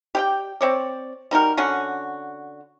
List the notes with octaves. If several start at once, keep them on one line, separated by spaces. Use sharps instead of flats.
G4 D5 G5
C4 C#5 D5
G3 D#4 F#4 A#4
D3 C#4 F#4